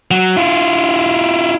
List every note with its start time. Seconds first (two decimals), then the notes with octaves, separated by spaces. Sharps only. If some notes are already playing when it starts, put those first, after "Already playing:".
0.11 F#3
0.36 E4 F4